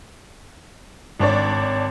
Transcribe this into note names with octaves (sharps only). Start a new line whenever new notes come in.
G#1 D4 C#5 D5